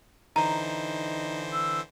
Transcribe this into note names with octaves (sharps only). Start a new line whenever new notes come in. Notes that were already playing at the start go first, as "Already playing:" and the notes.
D3 E3 D#4 C5 A#5
E6